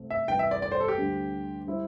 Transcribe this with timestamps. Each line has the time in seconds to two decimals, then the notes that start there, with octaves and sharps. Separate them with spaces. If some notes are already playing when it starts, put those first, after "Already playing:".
Already playing: C2 C3 A3 C4
0.10 E5
0.28 C3 E3 G3 G5
0.39 E5
0.51 D5
0.62 D5
0.72 C5
0.80 A4
0.88 G4
0.98 D2 D3 G3
1.67 G3 E4 C5